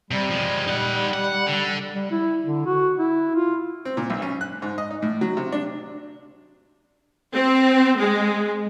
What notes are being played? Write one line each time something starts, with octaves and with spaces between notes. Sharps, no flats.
C3 G3
F3 G#3
D#4 F#5
F#5
D3
G3
E4
D3
F#4
E4
F4
C4
A#2
B1
C#4
F#6
G#2
D#5
D#4
A2
F#3
C3
D4
C4
G#3